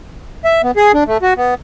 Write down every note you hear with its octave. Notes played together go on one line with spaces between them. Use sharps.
E5
B3
G#4
D4
A3
F#4
B3